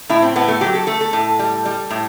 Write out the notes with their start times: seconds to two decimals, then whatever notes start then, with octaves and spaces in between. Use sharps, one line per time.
0.09 A2 E4
0.22 C4
0.36 A2 B3
0.48 A3
0.61 F#3 G4
0.75 A4
0.87 A3 A4
1.01 A4
1.13 A2
1.39 G3
1.65 G3
1.91 A2